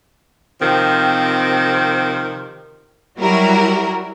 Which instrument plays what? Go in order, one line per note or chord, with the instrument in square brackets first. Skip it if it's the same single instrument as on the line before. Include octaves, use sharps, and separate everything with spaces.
[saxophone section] C3 D#3 F3 C4
[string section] F#3 G3 E4 F#4 A#4